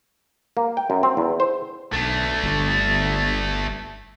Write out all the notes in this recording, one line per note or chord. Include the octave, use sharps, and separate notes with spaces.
A#3
G5
F#2
C4
E2
C5
B1 A3 D4
G1